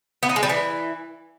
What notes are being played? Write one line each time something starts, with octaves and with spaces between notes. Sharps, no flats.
B3
D#4
G#3
G3
E3